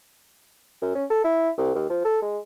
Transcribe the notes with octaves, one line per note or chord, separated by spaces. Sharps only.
F#2
C#4
A4
E4
C2
D#2
F3
A4
G#3